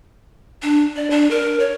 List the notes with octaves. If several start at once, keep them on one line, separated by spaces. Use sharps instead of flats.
D4
D5
D4
A#4
C#5